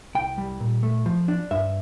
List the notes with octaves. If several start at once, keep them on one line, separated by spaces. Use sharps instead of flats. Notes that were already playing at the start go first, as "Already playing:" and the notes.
C2 G5
G3
A#2
A3
F3
D4
G2 E5